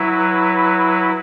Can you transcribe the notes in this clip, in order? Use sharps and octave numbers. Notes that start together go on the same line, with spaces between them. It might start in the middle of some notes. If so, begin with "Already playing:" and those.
Already playing: F#3 E4 B4